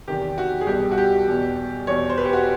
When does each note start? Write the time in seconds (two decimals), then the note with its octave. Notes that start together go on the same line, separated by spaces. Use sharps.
0.08 E2 C3 D#3 G4
0.38 F#4
0.61 G#4
0.67 C2 B2 G4
0.91 F#4
0.98 G4
1.28 E2 B2
1.87 E2 B2 C#5
2.09 C5
2.18 B4
2.25 G4
2.33 F#4